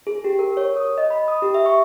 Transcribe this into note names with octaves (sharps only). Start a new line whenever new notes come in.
G#4
G4
A#4
C#5
D#6
D#5
B5
D#6
G4
E5
C#6